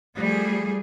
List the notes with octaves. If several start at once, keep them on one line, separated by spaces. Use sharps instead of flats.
F3 G3 A3 G#4